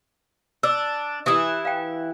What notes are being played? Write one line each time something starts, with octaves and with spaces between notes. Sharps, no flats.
D4 E6
E3 E4 G4 D#6
F5 G5